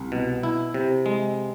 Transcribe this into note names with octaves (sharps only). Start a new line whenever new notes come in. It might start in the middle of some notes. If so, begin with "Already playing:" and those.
Already playing: C2
B2
E4
C3
G#3